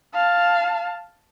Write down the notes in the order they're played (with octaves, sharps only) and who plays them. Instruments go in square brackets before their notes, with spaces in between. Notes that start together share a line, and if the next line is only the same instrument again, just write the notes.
[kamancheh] F5 A5